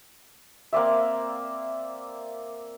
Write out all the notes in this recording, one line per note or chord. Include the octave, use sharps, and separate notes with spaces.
A#3 C4 D5 E5